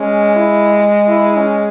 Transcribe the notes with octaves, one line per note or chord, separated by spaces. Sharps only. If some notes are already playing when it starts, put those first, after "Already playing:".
Already playing: G#3 C#4
E4
E4
C#4